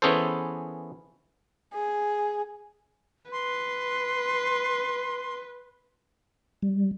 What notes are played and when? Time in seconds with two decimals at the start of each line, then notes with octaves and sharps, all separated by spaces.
0.02 E3 B3 C#4 G#4 A4 C5
1.74 G#4
3.32 B4 C6
6.62 G3